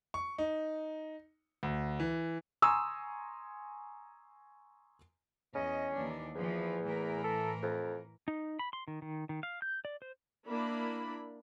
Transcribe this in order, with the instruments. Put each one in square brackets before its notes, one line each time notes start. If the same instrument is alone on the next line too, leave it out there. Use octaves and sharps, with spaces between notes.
[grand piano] C#6
D#4
D2
E3
[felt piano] G#5 A#5 C6 C#6 D#6 E6
[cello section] E2 D#5 [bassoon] C#4
[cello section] D#2 E3 D4
[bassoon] E2 [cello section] E3 F3
[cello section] A2 E3 A#4
[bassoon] A4
F2
[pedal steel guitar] D#4
B5
C6
D#3
D#3
D#3
F5
G6
D5
C5
[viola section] A#3 D4 E4 B5